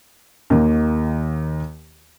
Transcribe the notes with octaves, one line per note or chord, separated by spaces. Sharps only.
D#2 D#3 A#3